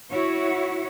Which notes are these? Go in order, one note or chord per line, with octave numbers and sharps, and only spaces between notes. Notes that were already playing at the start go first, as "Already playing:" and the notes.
E4 F#4 C#5